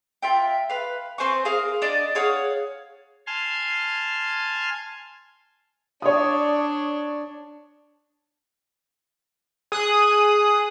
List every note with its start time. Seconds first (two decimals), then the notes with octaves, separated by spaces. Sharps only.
0.22 F4 E5 G5
0.70 B4 F5
1.18 C4 C5 G#5 C#6
1.45 G#4 A#4 F5
1.82 D4 D5 D#5
2.15 G#4 C#5 F5 F#5
3.27 G#5 A5 C6 F6
6.02 D4 C#5 D5 D#6
9.72 G#4 D#6 F#6